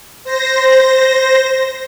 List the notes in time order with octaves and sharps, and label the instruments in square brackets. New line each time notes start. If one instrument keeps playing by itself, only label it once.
[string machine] C5 A#6